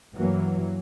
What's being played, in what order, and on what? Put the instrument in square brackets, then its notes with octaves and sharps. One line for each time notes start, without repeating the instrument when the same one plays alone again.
[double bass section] G2 E3 F#3 A#3